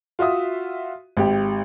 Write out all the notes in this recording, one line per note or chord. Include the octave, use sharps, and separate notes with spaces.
F4 F#4 E5 D#6
G#1 G4 G5